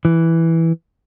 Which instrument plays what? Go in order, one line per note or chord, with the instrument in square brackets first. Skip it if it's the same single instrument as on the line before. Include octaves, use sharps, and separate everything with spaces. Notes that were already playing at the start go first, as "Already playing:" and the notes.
[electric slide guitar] E3